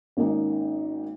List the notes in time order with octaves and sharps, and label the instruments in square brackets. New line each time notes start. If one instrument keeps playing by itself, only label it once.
[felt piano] G#1 A#3 C#4 D#4